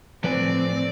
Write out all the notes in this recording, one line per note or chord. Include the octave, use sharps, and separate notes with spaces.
A2 F3 C4 B4 D5 G#5